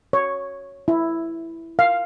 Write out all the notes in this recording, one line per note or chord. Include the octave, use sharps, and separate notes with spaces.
C#5
E4
F5